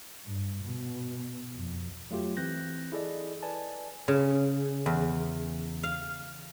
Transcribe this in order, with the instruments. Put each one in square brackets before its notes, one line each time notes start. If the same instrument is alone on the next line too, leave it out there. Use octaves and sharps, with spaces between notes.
[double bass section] G2
B2
F2
[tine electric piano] F#3 A3 F4 G4
E3 C4 F#6 G6 A#6
E4 G#4 A4 D5 D#5
B4 D5 G#5 A5
[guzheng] C#3
E2
F5